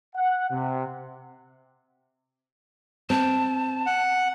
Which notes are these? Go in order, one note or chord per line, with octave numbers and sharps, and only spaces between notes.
F#5
C3
C4 A5
F#5